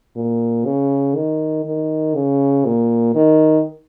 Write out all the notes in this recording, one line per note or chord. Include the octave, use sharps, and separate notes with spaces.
A#2
C#3
D#3
D#3
C#3
A#2
D#3